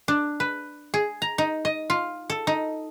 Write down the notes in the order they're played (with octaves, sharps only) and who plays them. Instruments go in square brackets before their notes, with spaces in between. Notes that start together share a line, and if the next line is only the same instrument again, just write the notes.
[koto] D4
B4
G#4
A#5
D#4
D#5
F4
A4
D#4